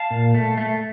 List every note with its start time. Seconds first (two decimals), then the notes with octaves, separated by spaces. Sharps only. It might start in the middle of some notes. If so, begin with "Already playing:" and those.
Already playing: F5 A5
0.11 A#2
0.35 A3
0.58 A3